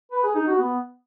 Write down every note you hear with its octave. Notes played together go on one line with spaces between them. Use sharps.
B4
G#4
D#4
F#4
B3